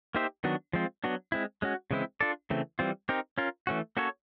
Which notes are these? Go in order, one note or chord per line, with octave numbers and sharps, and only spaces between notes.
A#3 D#4 G4 C5 E5
D#3 F#3 B3 D4 F#4
F3 G#3 C4 F4
F#3 B3 D4 F#4
G#3 C4 E4
G#3 C#4 F#4
C#3 E3 G#3 C4 E4
D4 F4 A4 D5
C#3 E3 A3 C4
E3 G3 C4 F4
C4 D#4 G4 A#4
C#4 F4 A#4
E3 A3 C#4 F#4
A#3 C#4 F#4 A4 C#5